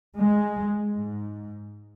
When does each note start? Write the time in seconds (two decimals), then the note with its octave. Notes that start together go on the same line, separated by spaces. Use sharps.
0.17 G#3
0.94 G#2